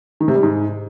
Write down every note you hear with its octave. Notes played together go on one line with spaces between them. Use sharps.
D#3
C3
G3
G#2